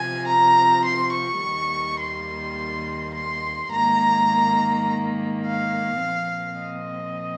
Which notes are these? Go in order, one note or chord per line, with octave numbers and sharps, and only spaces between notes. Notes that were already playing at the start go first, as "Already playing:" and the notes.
Already playing: C3 F3 C4 G#5
A#5
C6
C#6
D#2 D#3 G3 A#3
C6
C6
G#2 D#3 A#3 A#5
F5
A#2 F3 C4
D#5